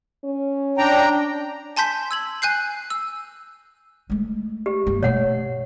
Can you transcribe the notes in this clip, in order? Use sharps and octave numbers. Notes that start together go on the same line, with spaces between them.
C#4
D4 G5 A#5
G#5 A5 C6 G6 B6
E6 G#6 F#7
G#5 F#6 G6 C7
E6
G#3 A3
G4
G2 A#3
B2 A3 C#5 F#5